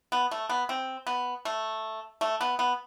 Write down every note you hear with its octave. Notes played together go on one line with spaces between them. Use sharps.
B3
A3
B3
C4
B3
A3
A3
B3
B3